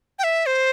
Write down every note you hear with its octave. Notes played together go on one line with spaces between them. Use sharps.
G5
E5
C5